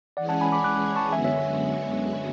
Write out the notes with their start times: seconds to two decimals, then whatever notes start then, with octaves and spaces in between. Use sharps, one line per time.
0.17 E3 G#3 C#4 G#4 D5 F#5
0.29 F#5 A5
0.41 G#5 B5
0.52 B5 D6
0.64 D6 F#6
0.96 A5 C#6
1.12 F#2 D3 G#3 B3 F#4 E5 G#5
1.24 C#5 E5